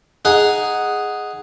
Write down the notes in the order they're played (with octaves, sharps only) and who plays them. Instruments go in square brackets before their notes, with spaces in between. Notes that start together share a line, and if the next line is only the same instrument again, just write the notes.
[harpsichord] D#4 G#4 F#5 G#5